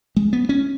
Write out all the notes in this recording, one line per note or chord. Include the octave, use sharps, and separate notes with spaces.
G#3
B3
C#4